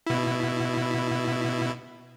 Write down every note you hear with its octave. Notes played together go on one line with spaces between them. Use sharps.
B2 E4